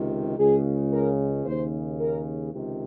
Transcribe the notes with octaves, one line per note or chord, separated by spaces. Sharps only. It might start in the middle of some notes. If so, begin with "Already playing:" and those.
Already playing: C#2 C3 D#3
C#2 C#3 G#4
A#4
D#2 C#3 C5
A#4
C#2 C3 D#3